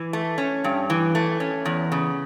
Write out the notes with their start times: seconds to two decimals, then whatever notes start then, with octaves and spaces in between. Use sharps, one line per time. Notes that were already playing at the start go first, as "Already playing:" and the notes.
Already playing: E3
0.13 A3
0.38 C#4
0.64 G2
0.90 E3
1.15 A3
1.40 C#4
1.65 E2
1.92 C#3